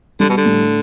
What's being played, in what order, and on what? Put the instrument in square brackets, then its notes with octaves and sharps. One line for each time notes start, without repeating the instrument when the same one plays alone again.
[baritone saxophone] D3 [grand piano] G3
[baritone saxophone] B2
D3
[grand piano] A2